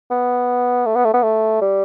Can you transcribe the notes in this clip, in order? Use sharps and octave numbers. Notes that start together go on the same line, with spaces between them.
B3
A3
B3
A3
B3
A3
G3